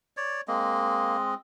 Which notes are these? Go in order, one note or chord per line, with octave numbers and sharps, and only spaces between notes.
C#5 D5
G#3 A#3 C4 D#5